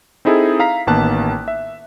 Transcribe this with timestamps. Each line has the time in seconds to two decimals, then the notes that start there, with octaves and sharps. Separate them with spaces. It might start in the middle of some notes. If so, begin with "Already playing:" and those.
0.25 C4 D#4 E4 G#4 A4
0.60 F5 A#5 B6
0.87 A1 D#3 A#3 B3 A5 F#6
1.48 E5